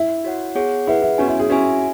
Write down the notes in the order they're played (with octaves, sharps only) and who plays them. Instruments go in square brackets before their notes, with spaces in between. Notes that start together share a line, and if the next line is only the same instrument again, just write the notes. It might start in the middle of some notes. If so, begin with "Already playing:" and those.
Already playing: [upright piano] E4
[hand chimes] F#4 C#5 F#5
B3 G#4 C#5 F#5
[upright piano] E4 [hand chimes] G#4 B4 F#5
[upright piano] E4
[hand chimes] B3 F#4 C#5 G#5 [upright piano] C#4
[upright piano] E4
G#4
[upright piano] C#4 [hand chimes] F#4 E5 G#5